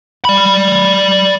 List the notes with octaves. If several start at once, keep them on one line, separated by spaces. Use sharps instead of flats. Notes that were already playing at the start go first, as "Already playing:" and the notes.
D5 B5